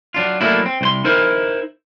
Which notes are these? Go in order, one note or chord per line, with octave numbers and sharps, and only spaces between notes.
F#3 D4 F4
F#3 A3 A#3 D4 E4
C4
C2 C5 C6
D#4 E4 A#4 C5